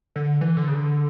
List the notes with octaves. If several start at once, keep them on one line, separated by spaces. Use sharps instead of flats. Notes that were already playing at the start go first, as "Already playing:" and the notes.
D3
E3
D3
C#3
D3